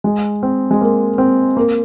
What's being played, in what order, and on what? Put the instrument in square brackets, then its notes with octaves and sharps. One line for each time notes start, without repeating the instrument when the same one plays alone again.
[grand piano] G#3
C4
G#3
A#3
C4
A#3